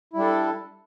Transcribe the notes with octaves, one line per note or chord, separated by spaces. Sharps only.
G3 D4 E4 A4